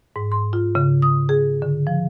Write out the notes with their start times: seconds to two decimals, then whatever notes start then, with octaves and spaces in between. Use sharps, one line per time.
0.16 G#2
0.32 C6
0.53 F4
0.75 C#3
1.02 D#6
1.29 G#4
1.62 D3
1.87 F3